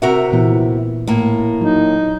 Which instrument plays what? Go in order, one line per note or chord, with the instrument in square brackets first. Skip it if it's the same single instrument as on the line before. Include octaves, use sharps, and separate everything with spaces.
[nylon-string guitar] C3 F#4 A#4 [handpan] E5 F#5
[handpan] A#2 E3 B3
[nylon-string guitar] A2 A#3
[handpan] F#3 [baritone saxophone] D#4